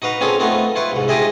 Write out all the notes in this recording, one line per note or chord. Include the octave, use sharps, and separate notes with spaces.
D#4 F#4 B4 F5
C4 C#4 F4 G#4 A4
A3 B3 C4 D#4 F4
E4 F4 B4 C#6
C2 G#2
D#4 F4 G4 G#4 D#5 E5